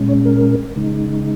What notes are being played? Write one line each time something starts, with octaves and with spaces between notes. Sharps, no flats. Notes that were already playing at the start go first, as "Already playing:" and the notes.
Already playing: A#2 G#3 C#4
C#5
A#4
C#3 G#3 D#4